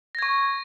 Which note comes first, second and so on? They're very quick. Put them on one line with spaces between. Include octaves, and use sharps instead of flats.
A#6 G#6 C#6